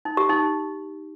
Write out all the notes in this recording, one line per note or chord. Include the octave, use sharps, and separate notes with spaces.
D#4
G4
D#4